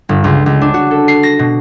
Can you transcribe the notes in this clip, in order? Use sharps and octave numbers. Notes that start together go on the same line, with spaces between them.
G1
C#2
C#2
D4
F#4
A4
C7
A#6
B2